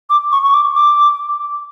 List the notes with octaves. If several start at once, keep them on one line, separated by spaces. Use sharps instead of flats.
D6
C#6
C#6
D6
D6